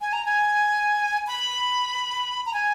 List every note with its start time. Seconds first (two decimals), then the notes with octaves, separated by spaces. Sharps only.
0.01 G#5
0.13 A#5
0.26 G#5
1.27 B5
2.46 A#5
2.54 G#5